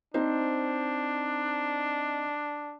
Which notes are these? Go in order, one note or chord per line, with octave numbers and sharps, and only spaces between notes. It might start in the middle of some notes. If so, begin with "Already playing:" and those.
C4 D4 D#4 C5